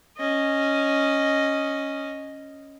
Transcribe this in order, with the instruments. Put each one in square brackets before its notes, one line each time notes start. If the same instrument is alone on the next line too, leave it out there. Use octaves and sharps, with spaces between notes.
[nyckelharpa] C#4 D#5